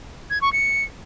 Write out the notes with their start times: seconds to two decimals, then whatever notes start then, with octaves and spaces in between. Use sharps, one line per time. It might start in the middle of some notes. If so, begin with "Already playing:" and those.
0.30 G#6
0.41 C#6
0.53 C#7